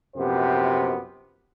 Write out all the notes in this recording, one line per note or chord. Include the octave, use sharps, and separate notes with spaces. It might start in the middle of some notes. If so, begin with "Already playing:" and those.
A#1 F#2 C3 B3 G4 C5